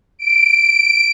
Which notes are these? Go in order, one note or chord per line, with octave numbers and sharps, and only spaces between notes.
D7